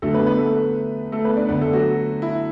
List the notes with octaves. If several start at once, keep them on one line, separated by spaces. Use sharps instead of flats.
D2 D3 F#3 A3 A4
B3 B4
B3 B4
A3 A4
A3 A4
B3 B4
D4 D5
D2 D3 B3 B4
A3 A4
F#3 F#4
E4